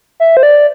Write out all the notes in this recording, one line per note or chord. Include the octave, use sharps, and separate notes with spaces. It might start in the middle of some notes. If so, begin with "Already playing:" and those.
E5
C5
D5